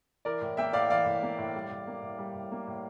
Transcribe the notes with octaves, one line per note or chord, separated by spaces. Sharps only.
E3 A#4 D5
A2
A#3 E5 G5
A2 D5 F5
E3 D5 F5
A2
A#3
A2
G3
A2
A#3
A2
G3
A2
A#3
A2